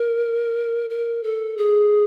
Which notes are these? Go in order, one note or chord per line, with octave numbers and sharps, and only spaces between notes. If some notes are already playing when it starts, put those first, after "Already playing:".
Already playing: A#4
A#4
A4
G#4